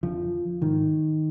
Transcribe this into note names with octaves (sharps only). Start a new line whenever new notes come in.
F2 D3 F3
G#2 D#3